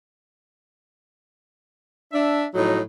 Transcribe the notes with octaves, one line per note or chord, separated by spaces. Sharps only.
D4 E5
A2 F3 F#3 D#4